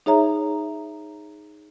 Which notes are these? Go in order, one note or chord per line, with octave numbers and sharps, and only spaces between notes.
D#4 G#4 C#5 E5 A#5